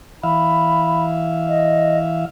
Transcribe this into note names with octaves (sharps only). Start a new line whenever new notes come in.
E3 E5 F5 B5
D#5